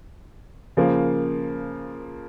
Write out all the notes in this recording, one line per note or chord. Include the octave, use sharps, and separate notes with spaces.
C#3 F3 A#3